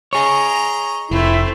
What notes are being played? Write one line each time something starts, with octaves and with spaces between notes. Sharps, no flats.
G#4 C#5 D#5 A#5
F1 A3 C4 E4